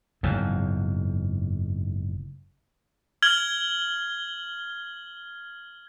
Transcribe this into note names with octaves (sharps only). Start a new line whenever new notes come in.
F#1 E2 G#2
F6 G#6 F#7 G7